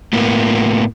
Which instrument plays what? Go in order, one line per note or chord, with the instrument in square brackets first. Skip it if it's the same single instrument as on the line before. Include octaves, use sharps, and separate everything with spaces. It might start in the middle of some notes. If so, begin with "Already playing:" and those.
[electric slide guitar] A2 A#3 B3